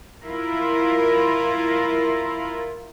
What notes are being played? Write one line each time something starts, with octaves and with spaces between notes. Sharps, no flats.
E4 F4 A#4